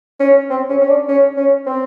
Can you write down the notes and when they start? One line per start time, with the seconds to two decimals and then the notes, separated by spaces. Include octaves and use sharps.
0.20 C#4
0.50 C4
0.70 C#4
0.81 C#4
0.89 D4
1.08 C#4
1.37 C#4
1.66 C4